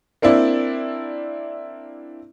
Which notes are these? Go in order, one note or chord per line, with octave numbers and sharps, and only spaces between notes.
A#3 C4 D4 E4 D5